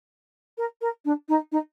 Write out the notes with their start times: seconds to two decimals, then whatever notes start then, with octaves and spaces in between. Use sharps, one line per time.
0.58 A#4
0.81 A#4
1.05 D4
1.29 D#4
1.52 D#4